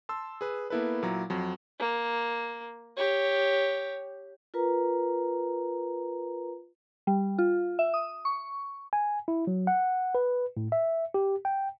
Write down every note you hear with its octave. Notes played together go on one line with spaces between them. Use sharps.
A5 C6 E6
G#4 B4
A#3 B3 E4 A4 B4
A#2 F#3 E4 A#5
F2 F#3
A#3
G4 C#5
F4 A#4 B4 A#5
G3
F4
E5
D#6
C#6
G#5
E4
F#3
F#5
B4
A2
E5
G4
G5